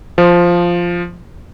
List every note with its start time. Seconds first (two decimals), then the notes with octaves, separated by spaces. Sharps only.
0.18 F3